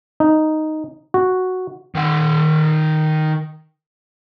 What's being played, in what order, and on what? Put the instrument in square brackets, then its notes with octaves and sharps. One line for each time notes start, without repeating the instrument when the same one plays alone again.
[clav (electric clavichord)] D#4
F#4
[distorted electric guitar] D#3 F#5